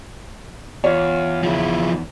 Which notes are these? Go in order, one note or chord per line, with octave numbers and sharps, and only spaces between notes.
E2 F4 C#5
C#3 F3 E4